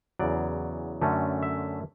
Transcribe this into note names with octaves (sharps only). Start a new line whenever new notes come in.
E2 C#3 F#3 D5
F#2 D3 A3 C#4
E5